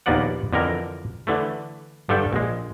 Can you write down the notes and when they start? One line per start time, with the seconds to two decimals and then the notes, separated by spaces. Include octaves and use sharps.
0.06 A#1 D#2 A#3 B3 D5 F#5
0.53 F2 D3 E3 A#4
1.27 D3 E3 A3
2.09 G2 D3 G3 A4 G5
2.33 A#1 G#3